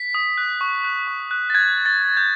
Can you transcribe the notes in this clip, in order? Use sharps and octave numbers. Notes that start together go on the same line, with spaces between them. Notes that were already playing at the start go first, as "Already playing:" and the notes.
Already playing: B6
D#6
F#6
C#6
F#6
C#6
F#6
A6
F#6 G#6
F#6
A6
F#6
G6